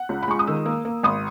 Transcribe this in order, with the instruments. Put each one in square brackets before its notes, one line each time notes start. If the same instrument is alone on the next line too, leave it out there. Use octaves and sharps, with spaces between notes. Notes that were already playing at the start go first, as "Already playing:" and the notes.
Already playing: [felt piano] F#5
C#2
B5
G#3 C#6
D#6
D#3 E6
A#3
A#3
G#1 D#6